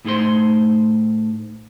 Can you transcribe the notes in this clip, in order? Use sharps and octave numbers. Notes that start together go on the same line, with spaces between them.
A2 A3 D#4 G#4 C5 C6